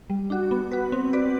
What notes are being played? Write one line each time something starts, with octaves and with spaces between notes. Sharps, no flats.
G3
D4 F#4
B3
F#4 B4
C4
F#4 B4 D5